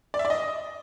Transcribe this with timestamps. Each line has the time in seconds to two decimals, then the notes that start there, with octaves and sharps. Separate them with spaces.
0.14 D5
0.19 E5
0.25 D5
0.30 D#5